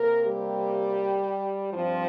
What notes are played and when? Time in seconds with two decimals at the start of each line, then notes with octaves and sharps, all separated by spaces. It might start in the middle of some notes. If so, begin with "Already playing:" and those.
Already playing: C3 A#3 A#4
0.25 G3 G4
1.73 G2 F3 G3 C4 F4